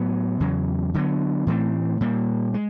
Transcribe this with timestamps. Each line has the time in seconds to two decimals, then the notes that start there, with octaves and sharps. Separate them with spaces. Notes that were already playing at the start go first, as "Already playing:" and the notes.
Already playing: A2 F#3 B3
0.40 E2 C#3 F#3
0.94 D3 F#3 B3
1.47 A2 E3 A3 C4
2.01 A#2 G3 A#3
2.54 G#3